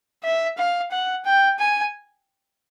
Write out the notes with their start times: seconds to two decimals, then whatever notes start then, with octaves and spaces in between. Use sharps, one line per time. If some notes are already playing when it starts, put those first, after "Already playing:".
0.24 E5
0.58 F5
0.91 F#5
1.25 G5
1.59 G#5